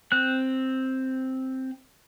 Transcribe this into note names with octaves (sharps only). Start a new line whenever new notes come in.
C4 F#6